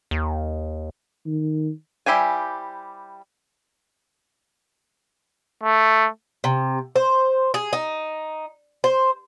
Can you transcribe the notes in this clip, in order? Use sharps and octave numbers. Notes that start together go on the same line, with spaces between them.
D#2
D#3
G3 E4 G4 C5 G#5
A3
C3
C5
G#4
D#4
C5